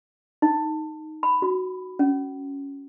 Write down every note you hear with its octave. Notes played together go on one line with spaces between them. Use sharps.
D#4
B5
F#4
C#4